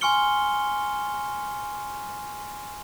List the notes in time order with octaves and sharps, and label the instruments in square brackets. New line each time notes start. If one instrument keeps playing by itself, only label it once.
[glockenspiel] G#5 C6 C#6 F6 C#7 G7